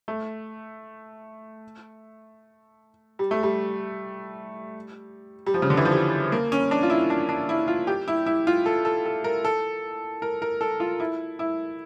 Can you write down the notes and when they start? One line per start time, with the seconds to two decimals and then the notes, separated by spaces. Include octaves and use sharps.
0.08 A3
3.19 G3
3.31 A3
3.43 G3
5.46 G3
5.54 F3
5.62 C#3
5.70 D3
5.77 E3
5.85 F3
5.92 G3
6.32 A#3
6.52 C#4
6.71 D4
6.83 F4
6.90 E4
7.10 D4
7.29 D4
7.49 E4
7.68 F4
7.87 G4
8.08 E4
8.26 E4
8.47 F4
8.66 A4
8.85 A4
9.06 A4
9.24 A#4
9.45 A4
10.22 A#4
10.42 A#4
10.61 A4
10.80 F4
11.00 E4
11.39 E4